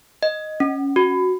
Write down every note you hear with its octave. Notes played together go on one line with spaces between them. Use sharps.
D#5
C#4
F#4